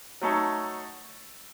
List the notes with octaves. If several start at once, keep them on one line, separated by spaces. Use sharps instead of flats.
F#3 A3 D#4 A4 C#5